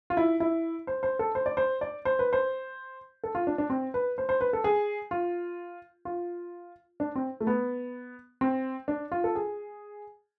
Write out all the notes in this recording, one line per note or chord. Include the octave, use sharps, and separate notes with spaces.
F4
E4
E4
C5
C5
A4
C5
D5
C5
D5
C5
B4
C5
A4
F4
D4
D4
C4
B4
C5
C5
B4
A4
G#4
F4
F4
D4
C4
A3
B3
C4
D4
F4
A4
G#4